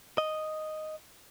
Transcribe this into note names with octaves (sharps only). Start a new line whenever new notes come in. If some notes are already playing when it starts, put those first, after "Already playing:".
D#5